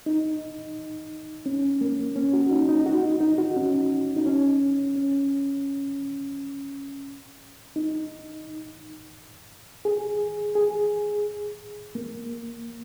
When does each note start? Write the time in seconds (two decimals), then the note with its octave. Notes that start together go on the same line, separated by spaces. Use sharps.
0.06 D#4
1.46 C#4
1.81 A#3
2.16 C#4
2.33 F#4
2.51 D#4
2.69 D#4
2.86 F#4
3.03 D#4
3.21 D#4
3.38 F#4
3.56 C#4
4.17 D#4
4.26 C#4
4.96 C#4
7.76 D#4
9.85 G#4
10.55 G#4
11.95 A#3